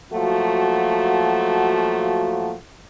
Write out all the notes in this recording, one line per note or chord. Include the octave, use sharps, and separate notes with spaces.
F3 F#3 A3 A#3 F#4